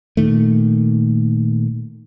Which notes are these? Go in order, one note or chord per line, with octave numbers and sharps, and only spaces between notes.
A#2 D#3 A3